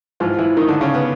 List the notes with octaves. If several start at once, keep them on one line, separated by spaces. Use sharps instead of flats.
G#2 E3 F3 F4
E3 E4
D#3 D#4
D3 D4
C#3 C#4
B3